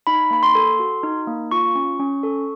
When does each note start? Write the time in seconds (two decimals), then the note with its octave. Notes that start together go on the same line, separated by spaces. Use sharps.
0.07 D#4 B5
0.31 A#3 B5
0.43 C6
0.55 A4
0.80 F#4
1.03 D#4
1.27 A#3
1.51 F4 C#6
1.75 C#4
2.00 C#4
2.23 A4